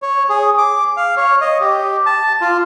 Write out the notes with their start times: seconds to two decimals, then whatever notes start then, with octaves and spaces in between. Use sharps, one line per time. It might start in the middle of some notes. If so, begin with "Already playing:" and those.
0.02 C#5
0.29 G#4
0.58 D6
0.97 F5
1.17 C#5
1.41 D#5
1.61 G4
2.06 A5
2.41 F4